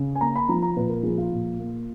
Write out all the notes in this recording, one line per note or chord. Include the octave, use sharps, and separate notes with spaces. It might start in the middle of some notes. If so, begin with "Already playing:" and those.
Already playing: C#3
G#5
A#3 A#5
B5
F3 A#5
A#5
A#2 B4
A#4
F3 G#4
F4
A#2
A#3